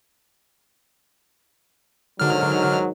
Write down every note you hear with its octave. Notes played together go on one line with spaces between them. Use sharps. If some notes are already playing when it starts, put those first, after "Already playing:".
G#2 D3 D#3 F#3 F6